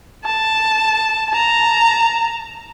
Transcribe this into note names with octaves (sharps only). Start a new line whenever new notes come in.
A5
A5 A#5